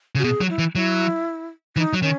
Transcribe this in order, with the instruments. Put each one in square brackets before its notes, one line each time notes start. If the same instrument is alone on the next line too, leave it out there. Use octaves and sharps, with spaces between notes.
[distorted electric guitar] C#3
[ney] F#4
[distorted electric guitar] B2 [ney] G#4
[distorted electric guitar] F#3
[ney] E4
[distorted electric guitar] E3
[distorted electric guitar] F#3 [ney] E4
[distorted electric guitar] E3 [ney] D#4
[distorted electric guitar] F#3
[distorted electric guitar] D#3 [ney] C#4